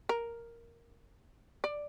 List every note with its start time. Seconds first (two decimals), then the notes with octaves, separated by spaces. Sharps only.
0.09 A#4
1.64 D5